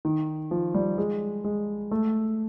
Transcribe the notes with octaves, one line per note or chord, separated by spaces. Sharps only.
D#3
F3
G3
G#3
G#3
A3